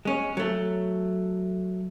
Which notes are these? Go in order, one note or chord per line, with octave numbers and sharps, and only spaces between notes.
G#3 C#4
F#3 A3